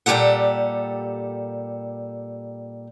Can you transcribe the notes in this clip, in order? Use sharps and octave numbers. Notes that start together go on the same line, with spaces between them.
A#2 G3 G4 A4 F#5